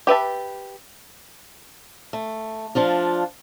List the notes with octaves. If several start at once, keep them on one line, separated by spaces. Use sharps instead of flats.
G4 B4 E5 A5
A3
F3 D4 F4